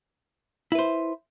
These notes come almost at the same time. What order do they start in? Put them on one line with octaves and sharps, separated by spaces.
E4 B4 C5